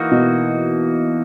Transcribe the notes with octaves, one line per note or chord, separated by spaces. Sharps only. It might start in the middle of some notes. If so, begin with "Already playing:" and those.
Already playing: E3 A#3 D#4 F#4
B2